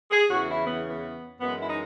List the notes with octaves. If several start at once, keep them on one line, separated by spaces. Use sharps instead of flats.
G#4
E2 C#3 E3 F#4
E4
B3
B3
F#2 E3 G#3 B3
E4
D#4